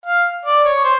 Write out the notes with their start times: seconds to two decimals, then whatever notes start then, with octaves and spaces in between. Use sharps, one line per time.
0.06 F5
0.45 D5
0.65 C#5
0.84 C5